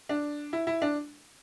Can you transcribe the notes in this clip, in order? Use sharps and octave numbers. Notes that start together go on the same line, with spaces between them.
D4
E4
E4
D4